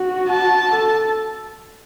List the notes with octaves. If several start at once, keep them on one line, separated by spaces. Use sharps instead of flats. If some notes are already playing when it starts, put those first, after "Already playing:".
Already playing: F#4
A5
A4